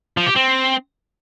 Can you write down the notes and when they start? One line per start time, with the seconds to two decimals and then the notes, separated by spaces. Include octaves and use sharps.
0.17 F3
0.26 G4
0.35 C4